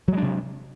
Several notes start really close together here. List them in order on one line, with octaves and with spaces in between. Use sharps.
F#3 G#3 D4 C3